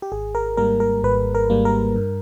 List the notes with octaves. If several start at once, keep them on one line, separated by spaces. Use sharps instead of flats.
G4
G#1 G#4
A#4
G#2 G3 A#3 A#4
A#4
G#1 B4
A#4
G#2 G3 A#3
A#4
G2